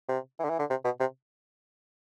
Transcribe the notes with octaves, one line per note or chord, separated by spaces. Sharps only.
C3
E3
D3
E3
D3
C3
B2
C3